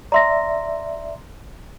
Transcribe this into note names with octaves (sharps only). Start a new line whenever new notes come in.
D5 E5 A#5 C6 A#6